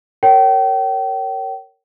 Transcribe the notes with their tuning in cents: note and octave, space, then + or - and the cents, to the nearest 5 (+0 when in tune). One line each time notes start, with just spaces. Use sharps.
A#4 -20 C#5 +0 G5 -35